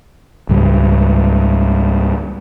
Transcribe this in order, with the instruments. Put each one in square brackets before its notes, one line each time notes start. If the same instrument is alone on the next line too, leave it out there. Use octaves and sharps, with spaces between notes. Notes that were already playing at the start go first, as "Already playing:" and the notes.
[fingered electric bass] C#2 G#2 G3